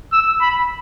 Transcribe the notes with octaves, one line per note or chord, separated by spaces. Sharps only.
E6
B5